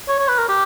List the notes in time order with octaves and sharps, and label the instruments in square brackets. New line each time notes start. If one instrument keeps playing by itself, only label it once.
[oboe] C#5
C#5
B4
A#4
G4